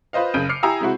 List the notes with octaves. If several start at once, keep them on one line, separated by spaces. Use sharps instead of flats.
F4 B4 C5 D#5 F5
F#1 C#3 G6 D7 D#7
D6 F6 C7 C#7
E4 G4 G#5 A#5 D#6 E6
C3 G#3 E4 F#4